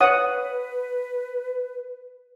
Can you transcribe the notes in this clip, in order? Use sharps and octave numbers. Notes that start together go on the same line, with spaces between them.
B4 C#5 F#5 D#6